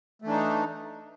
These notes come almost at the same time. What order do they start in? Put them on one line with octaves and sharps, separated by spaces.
A3 E3 D4 D#4